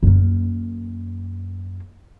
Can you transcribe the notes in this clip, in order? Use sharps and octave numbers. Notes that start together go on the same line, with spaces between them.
F#2 A#3